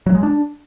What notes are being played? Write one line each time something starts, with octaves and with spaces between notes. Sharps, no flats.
F#3
G#3
D4